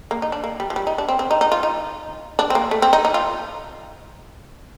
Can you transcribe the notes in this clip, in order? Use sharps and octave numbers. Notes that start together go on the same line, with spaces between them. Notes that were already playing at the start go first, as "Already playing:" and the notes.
A#3
D#4
D4
A#3
G3
F3
G3
D#4
D4
C4
C4
D#4
D#4
F4
D#4
D4
C4
A#3
A3
C4
D#4
D#4
F4